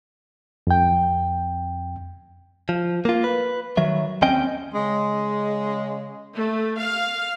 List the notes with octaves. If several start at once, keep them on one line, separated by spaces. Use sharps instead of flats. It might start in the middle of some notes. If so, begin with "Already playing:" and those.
F2 G5
F3
A#3 F4
B4
D#3 F#3 E5
D#2 C4 C#4 D#5 G5
C#3 G#3
A3
F5